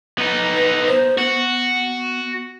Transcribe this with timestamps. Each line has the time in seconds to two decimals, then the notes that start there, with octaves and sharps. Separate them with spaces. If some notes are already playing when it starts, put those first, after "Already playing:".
0.18 B3 D#4
0.55 B4
0.87 C5
1.18 B3 F#4